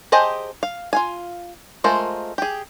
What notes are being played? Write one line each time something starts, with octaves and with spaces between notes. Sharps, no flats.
G4 G#4 C5 D#5 A5
F5
F4 F5 G#5
G#3 A3 F4 A#4 C5
G4 G#4